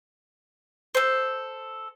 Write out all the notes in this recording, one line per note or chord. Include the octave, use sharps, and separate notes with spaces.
A4 C5